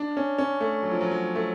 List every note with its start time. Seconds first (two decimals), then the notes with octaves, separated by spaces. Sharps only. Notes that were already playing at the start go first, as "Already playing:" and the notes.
Already playing: D4
0.17 C#4
0.38 C#4
0.60 A3
0.83 F#3
0.91 F3
1.01 F#3
1.11 F#3
1.35 A3